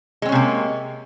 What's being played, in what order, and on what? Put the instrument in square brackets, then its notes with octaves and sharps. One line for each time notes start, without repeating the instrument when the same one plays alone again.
[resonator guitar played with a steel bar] G#3
C4
C#4
C3
A#3